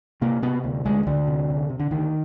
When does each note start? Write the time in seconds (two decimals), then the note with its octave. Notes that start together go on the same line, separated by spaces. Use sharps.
0.21 C3 A#3
0.42 C3 B3
0.64 D2
0.85 D2 G#3
1.07 D2 D3
1.28 C3
1.49 C3
1.69 C3
1.80 D3
1.91 D2 D#3